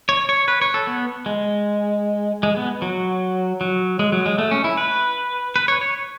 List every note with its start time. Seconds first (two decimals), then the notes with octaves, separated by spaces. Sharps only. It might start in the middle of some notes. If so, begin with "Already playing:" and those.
0.09 C#5
0.29 C#5
0.48 B4
0.61 C#5
0.74 A4
0.87 B3
1.26 G#3
2.43 G#3
2.56 B3
2.82 F#3
3.61 F#3
3.99 G#3
4.12 F#3
4.26 G#3
4.38 A3
4.51 C#4
4.64 E4
4.77 B4
5.56 B4
5.68 C#5
5.81 C#5